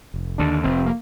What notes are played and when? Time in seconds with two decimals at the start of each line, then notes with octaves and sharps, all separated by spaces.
0.14 F1
0.38 D#2 D3 D4
0.64 F1 C4
0.86 A#3